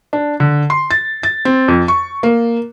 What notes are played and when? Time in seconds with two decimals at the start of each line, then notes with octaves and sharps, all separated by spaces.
0.13 D4
0.40 D3
0.70 C6
0.91 A6
1.23 A6
1.45 C4
1.68 F2
1.88 C#6
2.23 A#3